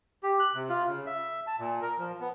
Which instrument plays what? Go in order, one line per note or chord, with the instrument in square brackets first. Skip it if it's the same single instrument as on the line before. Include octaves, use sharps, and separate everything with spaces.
[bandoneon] G4
F#6
C3
F4
C#3
E5
A5
A#2
A#4
F3
B3